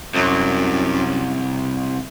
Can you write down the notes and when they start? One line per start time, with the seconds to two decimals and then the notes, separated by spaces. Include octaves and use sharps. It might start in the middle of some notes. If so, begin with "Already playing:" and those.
0.15 C2 F#2